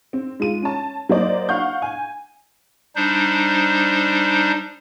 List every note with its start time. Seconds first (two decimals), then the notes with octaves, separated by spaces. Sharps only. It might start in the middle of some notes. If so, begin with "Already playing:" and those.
0.13 C4
0.40 G#3 F4 D#7
0.62 C#4 A5
1.09 F#3 A#3 C5 D5 D#5
1.49 F5 F#5 C#6 G6
1.82 G#5
2.96 G3 D4 D#4 C5